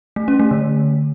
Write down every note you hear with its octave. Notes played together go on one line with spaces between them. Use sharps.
A3
C#4
A3
D3